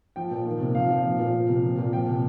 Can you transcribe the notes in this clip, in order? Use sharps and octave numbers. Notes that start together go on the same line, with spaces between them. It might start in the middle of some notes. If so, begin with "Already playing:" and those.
F3 G5
A#2
D#3
C3
F3 F5
A#2
F3
A#2
F3
C3
F3
A#2
F3 G5
C3